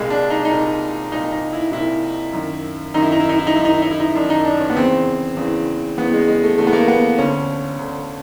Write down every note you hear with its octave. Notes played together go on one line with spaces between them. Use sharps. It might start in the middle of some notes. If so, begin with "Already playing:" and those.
Already playing: C2 A#2 G#3
D4
D#4
D4
D#4
C2 A#2
C2 A#2 D#4
D#4
E4
C2 A#2 E4
F#2 D#3
F#2 D#3 D#4
E4
D#4
E4
D#4
E4
D#4
F#2 D#3 E4
D#4
E4
D#4
E4
D#4
F#2 D#3 D4
D#4
D4
C#4
B3
E2 C#3 E3 C4
E2 C#3 E3
E2 C#3 E3 B3
G#3
G#3
A3
E2 C#3 E3 A3
B3
A#3
B3
D2 D3 C#4
D2 D3